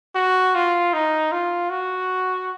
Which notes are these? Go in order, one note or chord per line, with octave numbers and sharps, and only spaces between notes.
F#4
F4
D#4
F4
F#4